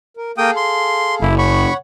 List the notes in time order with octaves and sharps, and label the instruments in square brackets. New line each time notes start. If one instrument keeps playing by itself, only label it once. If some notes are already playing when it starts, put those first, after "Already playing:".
[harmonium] A#4
[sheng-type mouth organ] A#3 G5 D#6 [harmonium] G#4 A4 F5
[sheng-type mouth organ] C6
[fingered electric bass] F#1 [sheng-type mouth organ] E4
[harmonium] C#5 F#5 [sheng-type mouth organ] B5 C#6